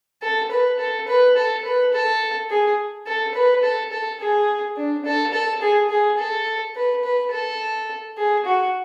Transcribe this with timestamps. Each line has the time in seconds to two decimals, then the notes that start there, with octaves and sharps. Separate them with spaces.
0.22 A4
0.51 B4
0.79 A4
1.08 B4
1.36 A4
1.65 B4
1.93 A4
2.50 G#4
3.06 A4
3.34 B4
3.63 A4
3.92 A4
4.20 G#4
4.77 D4
5.05 A4
5.33 A4
5.62 G#4
5.90 G#4
6.18 A4
6.75 B4
7.04 B4
7.32 A4
8.17 G#4
8.45 F#4